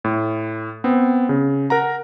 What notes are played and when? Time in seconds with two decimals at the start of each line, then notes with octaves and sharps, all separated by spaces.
0.04 A2
0.84 B3 C4
1.29 C#3
1.70 A#4 F#5 A#5